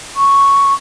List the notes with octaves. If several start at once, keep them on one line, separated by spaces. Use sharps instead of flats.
C#6